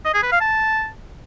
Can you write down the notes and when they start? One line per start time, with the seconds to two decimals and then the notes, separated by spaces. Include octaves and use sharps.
0.05 D#5
0.14 G#4
0.23 B4
0.32 F5
0.41 A5